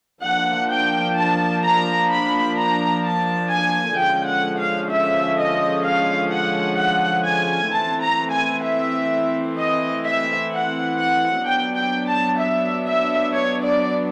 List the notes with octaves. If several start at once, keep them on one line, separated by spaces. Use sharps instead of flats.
F3 A#3 D4 F#5
G5
A5
A#5
B5
A#5
A5
G#5
D3 F3 G#3 C#4 G5
F#5
F5
E5
D#5
F5
F#5
F#5
G#5
E3 A3 C4 A5
A#5
G#5
E5
D#5
E5
F#5
F#5
F#3 B3 D4 G5
G5
A5
E5
E5
C#5
D5